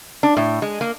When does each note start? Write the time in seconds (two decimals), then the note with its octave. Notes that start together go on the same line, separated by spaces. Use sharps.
0.23 D4
0.37 A2
0.62 G#3
0.81 A#3